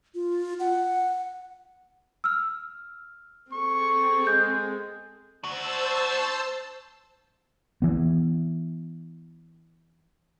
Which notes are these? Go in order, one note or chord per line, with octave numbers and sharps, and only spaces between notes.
F4
F#5
E6 F6
C4 G#4 A4 C#6
G#3 G6
D4 F#4 C5 A5 E6
E3 B3